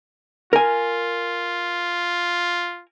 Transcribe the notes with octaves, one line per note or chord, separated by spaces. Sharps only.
F4 A#4 G#5